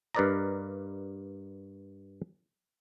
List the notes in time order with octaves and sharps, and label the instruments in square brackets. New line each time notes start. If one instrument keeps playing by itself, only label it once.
[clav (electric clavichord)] G2 A#4 B4 D5 D#5 A#5